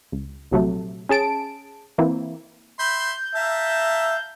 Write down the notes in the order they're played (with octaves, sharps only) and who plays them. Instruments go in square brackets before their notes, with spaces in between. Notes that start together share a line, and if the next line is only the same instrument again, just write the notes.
[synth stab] C#2
A#1 C3 F#3 A3
C#4 G#4 A5 D7
E3 A#3 C4 E4
[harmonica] E5 B5 C6 [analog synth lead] G6
[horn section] E5 [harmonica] F5 A5 A#5